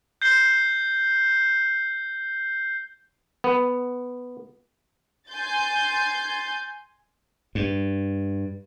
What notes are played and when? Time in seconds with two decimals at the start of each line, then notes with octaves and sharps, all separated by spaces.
0.22 G6 C7 G7
3.44 B3
5.30 G#5 C6 G6 A6
7.55 G2